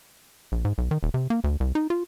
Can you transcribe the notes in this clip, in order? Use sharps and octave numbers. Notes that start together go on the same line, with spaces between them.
A#1
G#2
B1
D#3
D#1
C3
A#3
D2
C2
D#4
F4